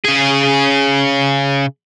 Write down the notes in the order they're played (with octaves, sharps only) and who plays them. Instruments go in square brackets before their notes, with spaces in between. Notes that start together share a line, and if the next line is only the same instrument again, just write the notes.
[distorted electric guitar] C#3 G#4